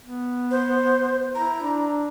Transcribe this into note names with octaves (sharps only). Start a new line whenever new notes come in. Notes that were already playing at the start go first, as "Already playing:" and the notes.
B3
C5
E4 A#5
D4